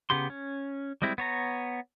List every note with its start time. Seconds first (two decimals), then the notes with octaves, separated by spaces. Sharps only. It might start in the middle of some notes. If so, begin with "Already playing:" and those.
0.10 C#3 B3 G4 C6
0.30 C#4
1.02 G3 G#3 C4 E4
1.18 B3 C#5 A#5